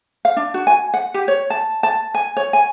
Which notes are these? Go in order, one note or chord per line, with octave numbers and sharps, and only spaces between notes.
F5
D4
F#4
G#5
F#5
G4
C#5
A5
A5
G#5
C#5
G#5